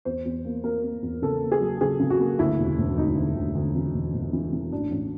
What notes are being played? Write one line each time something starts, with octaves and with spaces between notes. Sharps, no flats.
E2 C5
E2
A#3
A#3 A#4
A#3
E2
C#3 A4
A#3
G#4
F#3
C#3 G#4
C#3
F#4
A#3
D2 E4
E1
E1
D2 D#4
D2
D2
D2
E3
E1
E1
E3
E3
A1 D4
A1